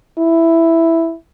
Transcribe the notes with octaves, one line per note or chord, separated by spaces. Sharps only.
E4